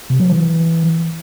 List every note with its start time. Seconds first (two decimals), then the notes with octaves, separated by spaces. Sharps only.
0.10 C3
0.20 F#3
0.29 E3